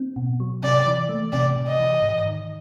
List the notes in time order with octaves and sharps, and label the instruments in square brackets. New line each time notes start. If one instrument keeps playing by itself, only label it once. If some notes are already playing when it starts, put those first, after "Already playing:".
Already playing: [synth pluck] C4
B2
F#3
[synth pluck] C3 [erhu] D5
[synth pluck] E3
A3
[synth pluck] C3 [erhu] D5
[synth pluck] C3
[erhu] D#5
[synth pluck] E3
G#2
D#3